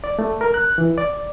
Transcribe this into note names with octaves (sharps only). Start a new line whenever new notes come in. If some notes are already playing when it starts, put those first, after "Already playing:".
D5
A3
A#4
F#6
E3
D5